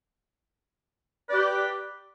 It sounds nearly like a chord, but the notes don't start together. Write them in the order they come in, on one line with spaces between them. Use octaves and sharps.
B4 D5 G4